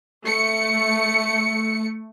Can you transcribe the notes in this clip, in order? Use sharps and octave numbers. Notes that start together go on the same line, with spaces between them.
A3 C#7